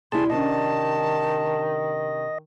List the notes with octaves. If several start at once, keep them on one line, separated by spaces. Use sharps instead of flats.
C3 G3 E4 G#4 A5 C6
C3 D#3 C#4 D4 D#5 A5